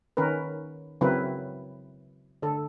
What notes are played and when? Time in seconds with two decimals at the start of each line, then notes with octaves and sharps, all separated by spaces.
0.17 D#3 C#4 A#4 B4
1.01 C#3 F#3 C4 E4 A#4 B4
2.42 D3 A4